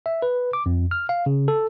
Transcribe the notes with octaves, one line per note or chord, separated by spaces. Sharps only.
E5
B4
D6
F2
F6
F5
C#3
A4